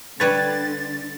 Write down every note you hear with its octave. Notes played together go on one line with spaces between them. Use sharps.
D3 G3 B4 C#5 A6